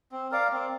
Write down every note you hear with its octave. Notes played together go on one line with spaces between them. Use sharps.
C4
A#4 D5 F5
C4